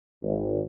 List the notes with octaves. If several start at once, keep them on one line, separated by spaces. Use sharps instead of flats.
G#1